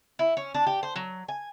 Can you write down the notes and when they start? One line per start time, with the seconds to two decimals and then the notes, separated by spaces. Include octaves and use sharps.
0.19 E4
0.37 C#4
0.54 D4
0.67 G4
0.83 C5
0.96 F#3
1.28 G#5